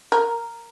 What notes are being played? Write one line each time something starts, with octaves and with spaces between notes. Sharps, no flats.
A#4